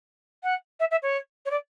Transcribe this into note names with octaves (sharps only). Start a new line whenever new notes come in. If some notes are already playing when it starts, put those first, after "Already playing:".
F#5
E5
E5
C#5
C#5
D5